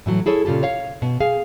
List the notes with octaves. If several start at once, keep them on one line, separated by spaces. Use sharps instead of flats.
A2 E3 F#3
E4 G#4 A4 C#5
A#2 C#3 F4 G4 A4
C#5 F5
B2
G#4 F5